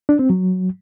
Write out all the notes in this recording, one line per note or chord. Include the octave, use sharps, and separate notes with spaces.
D4
C4
F#3